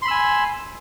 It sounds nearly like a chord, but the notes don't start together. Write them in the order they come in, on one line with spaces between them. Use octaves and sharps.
C6 B5 E6 G#5